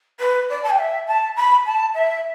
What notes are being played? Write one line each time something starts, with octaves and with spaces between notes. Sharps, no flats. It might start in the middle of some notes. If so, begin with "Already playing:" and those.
B4
D5
A5
G5
E5
A5
B5
A5
E5